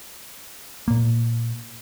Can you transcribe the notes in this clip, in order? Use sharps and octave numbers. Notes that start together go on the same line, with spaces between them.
A#2 A#3